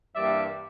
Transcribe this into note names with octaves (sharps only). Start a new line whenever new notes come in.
G2 E3 G3 A#3 D5 E5